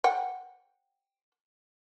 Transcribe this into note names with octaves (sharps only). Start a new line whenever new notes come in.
F#5 G5